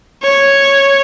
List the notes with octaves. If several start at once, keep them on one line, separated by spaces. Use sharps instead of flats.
C#5